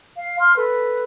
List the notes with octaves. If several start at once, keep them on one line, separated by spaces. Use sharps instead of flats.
F5
C6 F6
A4 B4